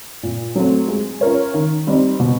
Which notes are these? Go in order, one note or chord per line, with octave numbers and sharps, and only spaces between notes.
A#2
F#3 A3 C4
G#3
C#4 F4 A#4 C#5
D#3
G3 C4 D#4
B2